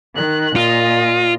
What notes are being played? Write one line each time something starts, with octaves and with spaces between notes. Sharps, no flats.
D#3 F#6
A#2 F4 D#5